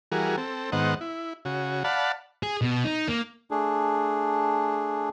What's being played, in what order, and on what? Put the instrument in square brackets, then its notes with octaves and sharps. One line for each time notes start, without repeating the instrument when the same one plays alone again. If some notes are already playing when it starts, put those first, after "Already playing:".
[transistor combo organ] E3 G3 F#4 G#4 A#4
C4 A4
G#2 D#3 B3 C5 D#5 F#5
E4
C#3 F#4
D5 F5 F#5 A5 B5
[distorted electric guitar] G#4
B2
D#4
A#3
[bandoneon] A3 D4 G#4